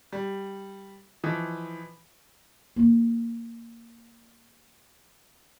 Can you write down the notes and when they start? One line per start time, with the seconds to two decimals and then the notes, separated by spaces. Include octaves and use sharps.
0.13 G3
1.24 E3 F3 D#4
2.76 A#3 F4